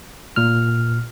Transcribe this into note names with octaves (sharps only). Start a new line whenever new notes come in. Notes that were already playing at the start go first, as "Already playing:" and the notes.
A#2 F6